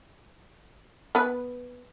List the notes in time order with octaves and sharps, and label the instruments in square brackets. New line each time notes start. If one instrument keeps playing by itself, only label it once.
[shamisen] B3 B4